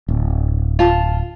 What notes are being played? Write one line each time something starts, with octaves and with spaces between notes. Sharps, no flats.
D1
F4 A5